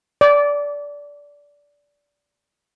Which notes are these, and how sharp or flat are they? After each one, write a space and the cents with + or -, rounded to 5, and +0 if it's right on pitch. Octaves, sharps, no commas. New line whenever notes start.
D5 -20